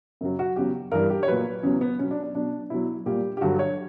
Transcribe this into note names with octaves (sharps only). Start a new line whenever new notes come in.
F#2 C#3 F#3
F#4
E2 C#3 F#3 G4
G2 E3 G3 A#4
G4
C#5
A#2 F#3 B4
E2 C#3 F#3 C#4
B3
B2 F#3 C#4
D4
D4
B2 F#3 D4
B2 F#3 E4
A#2 G3 G4
G4
G2 D3 F#3 F#4
C#5